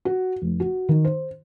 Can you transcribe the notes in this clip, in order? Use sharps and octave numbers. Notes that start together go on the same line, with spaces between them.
F#4
F1
F#4
D#3
C5